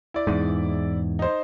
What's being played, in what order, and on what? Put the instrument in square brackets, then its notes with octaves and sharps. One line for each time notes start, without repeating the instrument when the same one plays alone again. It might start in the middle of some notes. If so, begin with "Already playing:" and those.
[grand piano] E4 D5
[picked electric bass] E2 G#2
[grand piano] D#4 C5